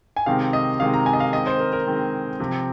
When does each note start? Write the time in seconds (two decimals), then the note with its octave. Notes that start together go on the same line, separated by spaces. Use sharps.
0.16 G#5
0.26 C3 D#3 G#3 C4 F5
0.53 D#5
0.80 C3 D#3 G#3 C4 F5
0.94 A#5
1.06 G#5
1.13 D#5
1.20 F5
1.33 D#3 G#3 C4 D#5
1.47 C5
1.60 A#4
1.73 A#4
1.87 D#3 G#3 C4
2.40 C3 F3 C4